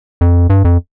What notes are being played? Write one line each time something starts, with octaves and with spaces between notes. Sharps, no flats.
F2
G2
F2